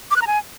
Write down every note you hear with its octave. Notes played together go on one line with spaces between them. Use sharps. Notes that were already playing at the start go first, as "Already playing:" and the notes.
D6
F#6
A#5
G#5